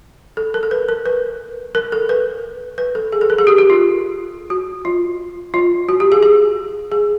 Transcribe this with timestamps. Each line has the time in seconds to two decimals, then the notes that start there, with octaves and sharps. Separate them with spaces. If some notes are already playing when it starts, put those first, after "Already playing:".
0.37 A4
0.54 A#4
0.63 A4
0.71 B4
0.89 A#4
1.06 B4
1.75 A#4
1.92 A4
2.09 B4
2.78 B4
2.95 A4
3.12 G#4
3.21 A4
3.30 A#4
3.38 G#4
3.47 G4
3.58 G4
3.70 F4
4.50 F#4
4.85 F4
5.54 F4
5.89 F#4
6.00 G4
6.12 G#4
6.23 G#4
6.92 G#4